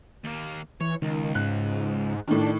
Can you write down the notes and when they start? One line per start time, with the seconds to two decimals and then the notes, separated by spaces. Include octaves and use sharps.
0.24 D#2 A#3
0.81 E3 C#5
1.02 C#2 D#3
1.35 G#2 F#6
2.28 A2 D#3 D4